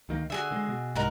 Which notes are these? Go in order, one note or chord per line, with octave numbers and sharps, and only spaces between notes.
D2 D#3 A#3
D3 F#4 G#4 E5
D3 G#3
B2
C2 G#2 D#4 A#4 F#5